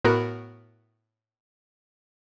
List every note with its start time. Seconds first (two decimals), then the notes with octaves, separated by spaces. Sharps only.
0.04 A2 B3 F#4 A#4 B5 F#6